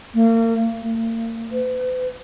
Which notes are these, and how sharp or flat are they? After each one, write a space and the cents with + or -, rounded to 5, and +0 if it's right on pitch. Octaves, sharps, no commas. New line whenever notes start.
A#3 -40
A#3 -40
B4 +45